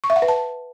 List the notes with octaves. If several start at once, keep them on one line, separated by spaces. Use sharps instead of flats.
C#6
E5
F#5
B4
A5